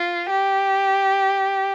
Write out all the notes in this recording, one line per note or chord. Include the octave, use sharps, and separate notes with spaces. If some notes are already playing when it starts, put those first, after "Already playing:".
Already playing: F4
G4